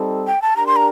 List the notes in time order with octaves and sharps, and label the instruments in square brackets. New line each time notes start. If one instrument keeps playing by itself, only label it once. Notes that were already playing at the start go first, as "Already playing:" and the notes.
Already playing: [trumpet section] G3 C4 D#4 A4
[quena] G5
A5
[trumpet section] D4 G4 A#4 [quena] A#5
[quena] C6
A#5